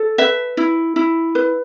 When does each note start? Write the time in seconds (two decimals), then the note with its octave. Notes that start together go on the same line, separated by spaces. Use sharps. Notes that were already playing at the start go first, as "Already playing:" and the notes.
Already playing: A4
0.18 B4 E5
0.57 E4
0.96 E4
1.35 B4